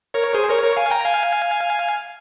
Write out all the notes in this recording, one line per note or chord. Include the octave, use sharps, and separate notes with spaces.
A#4 C#5
G#4 C5
A#4 C#5
A#4 C#5
F5 G#5
G5 A#5
F5 G#5